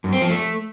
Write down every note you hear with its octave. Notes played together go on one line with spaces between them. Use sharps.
F#2
C4
F3
A3